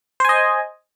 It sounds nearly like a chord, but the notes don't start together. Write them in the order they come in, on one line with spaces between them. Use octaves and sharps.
C5 G#5 D#5